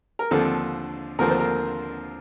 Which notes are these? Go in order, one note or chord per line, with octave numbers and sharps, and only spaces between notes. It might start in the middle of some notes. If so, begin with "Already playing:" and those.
A#4
D#2 D3 F3 C4 A4
D#2 D3 F3 C4 A#4
C5
A#4